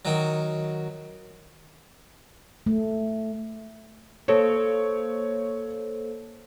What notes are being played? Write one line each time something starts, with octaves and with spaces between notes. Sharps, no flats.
D#3 F#3
A3
A#3 A4 C5 C#5